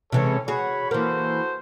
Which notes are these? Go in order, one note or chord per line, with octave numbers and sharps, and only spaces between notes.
C3 E3 G#3 C#4 A4 C#5
F#4 G#4 C#5 B5
E3 A#3 F#4 A4 C5